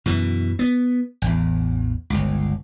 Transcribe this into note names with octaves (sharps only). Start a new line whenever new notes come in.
F#2 B2 E3
B3
A1 E2
G1 C#2